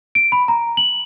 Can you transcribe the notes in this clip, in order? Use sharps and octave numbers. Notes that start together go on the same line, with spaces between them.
D7
B5
A#5
F#7